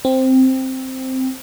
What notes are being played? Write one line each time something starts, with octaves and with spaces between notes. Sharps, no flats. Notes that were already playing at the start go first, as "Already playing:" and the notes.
C4